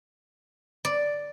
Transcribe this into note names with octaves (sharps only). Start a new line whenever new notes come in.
D5